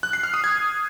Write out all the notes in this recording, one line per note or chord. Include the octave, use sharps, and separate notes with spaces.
F#6
C7
F6
D#6
G#6